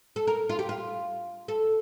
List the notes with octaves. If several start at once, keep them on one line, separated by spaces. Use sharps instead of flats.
A4
A#4
F4
G4
F4
A4